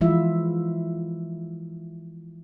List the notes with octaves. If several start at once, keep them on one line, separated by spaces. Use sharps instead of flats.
E3 F3 G#3 E4 F4 E5